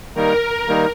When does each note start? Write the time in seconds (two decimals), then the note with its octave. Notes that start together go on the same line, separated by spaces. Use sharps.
0.14 D#3 G3 A#3 D#4 A#4
0.68 D#3 G3 A#3 D#4